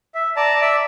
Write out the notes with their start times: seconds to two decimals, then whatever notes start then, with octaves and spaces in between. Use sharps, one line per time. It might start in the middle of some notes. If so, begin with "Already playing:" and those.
0.15 E5
0.36 D5 A5 A#5
0.61 D5 E5 E6